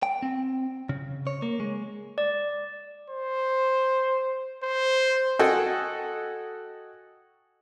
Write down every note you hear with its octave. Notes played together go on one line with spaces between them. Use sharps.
G5
C4
C#3
C#5
A#3
G#3
D5
C5
C5
F#4 A4 D#5 G5 G#5